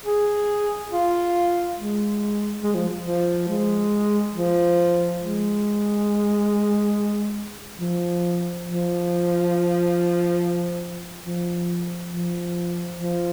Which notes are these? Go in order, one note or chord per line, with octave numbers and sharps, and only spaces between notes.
G#4
F4
G#3
G#3
F3
F3
G#3
F3
G#3
F3
F3
F3
F3
F3